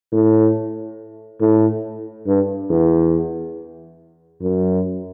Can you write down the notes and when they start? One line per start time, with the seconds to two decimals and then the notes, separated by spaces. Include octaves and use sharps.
0.13 A2
1.41 A2
2.27 G2
2.70 E2
4.41 F#2